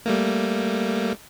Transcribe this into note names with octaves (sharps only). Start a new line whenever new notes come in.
G3 A3 A#3